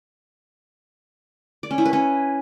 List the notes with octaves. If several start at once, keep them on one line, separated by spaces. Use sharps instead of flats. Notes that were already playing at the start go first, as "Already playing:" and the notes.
D5
C#4
E4
B4
C#4